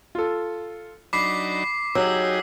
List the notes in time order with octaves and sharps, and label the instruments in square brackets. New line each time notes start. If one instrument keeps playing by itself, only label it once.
[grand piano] F4 A4
[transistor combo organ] F#3 D4 D#4 [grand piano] B5 [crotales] D6 B6 C7
[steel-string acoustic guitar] F#3 [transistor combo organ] D#4 G4 G#4 [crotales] E6